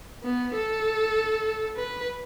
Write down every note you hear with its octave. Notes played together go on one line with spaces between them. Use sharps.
B3
A4
B4